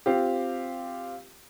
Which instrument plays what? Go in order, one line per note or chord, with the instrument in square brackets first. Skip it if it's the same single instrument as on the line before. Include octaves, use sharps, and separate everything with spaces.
[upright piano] C4 F4 G4